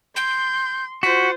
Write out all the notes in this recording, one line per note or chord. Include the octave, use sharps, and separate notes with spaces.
C6 G6
F4 F#4 C5 B6